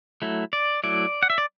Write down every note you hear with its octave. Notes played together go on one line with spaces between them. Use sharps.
F#3 A3 E4
D5
F#3 A3 E4 D5
F#5
E5
D5